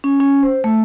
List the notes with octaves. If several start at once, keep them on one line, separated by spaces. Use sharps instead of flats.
C#4
C#4
C5
A3